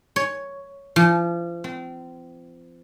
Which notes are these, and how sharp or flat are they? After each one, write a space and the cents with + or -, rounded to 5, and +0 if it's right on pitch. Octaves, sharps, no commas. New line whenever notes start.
C#5 +5
F3 -35
C4 -30